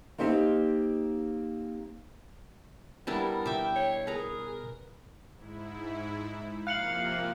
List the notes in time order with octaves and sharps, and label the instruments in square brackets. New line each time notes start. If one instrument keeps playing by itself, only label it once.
[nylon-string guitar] A#3 C4 D#4 G4 C5
[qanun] G3 D4 E4 [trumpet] B3 [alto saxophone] A#4
[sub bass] B2 [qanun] E5 D6 [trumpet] G5
[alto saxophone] C#5
[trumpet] G#4 [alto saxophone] A#4 [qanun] B4 A#5
[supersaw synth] G#2 E4
[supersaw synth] C3 F3 A#3 [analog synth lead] F5 [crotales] F#6 C#7 F#7